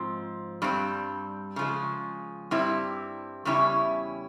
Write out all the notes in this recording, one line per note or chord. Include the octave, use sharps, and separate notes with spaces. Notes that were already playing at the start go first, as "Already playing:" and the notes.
Already playing: G#2 F3 C4
G2 G3 C4
C#3 F3 G#3
G2 G3 C4 E4
E2 C#3 G3 C#4 E4